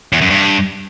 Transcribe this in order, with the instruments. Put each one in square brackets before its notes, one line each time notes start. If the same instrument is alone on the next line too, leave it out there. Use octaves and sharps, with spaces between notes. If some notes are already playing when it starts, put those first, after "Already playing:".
[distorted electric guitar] E2
F#2
G2